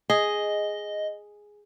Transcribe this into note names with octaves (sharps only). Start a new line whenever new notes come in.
G#4 D#5